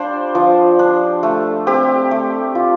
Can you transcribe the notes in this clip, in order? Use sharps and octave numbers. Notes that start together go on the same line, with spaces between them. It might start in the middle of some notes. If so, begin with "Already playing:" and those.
Already playing: G3 D4 F4 C5 D5
F3
D4
A3
C4 G4
A3
F4